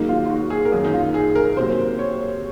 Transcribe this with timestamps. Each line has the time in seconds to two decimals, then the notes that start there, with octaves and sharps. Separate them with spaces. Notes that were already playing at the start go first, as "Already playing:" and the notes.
Already playing: G#2 D#3 F#3 A#3 D#4
0.09 F4
0.26 F4
0.30 F#4
0.50 G#4
0.65 A#4
0.72 F#2 D#3 F#3 A#3 G#4
0.85 D#4
0.93 F4
1.14 G#4
1.35 A#4
1.57 C3 F#3 A#3 C5
1.99 C#5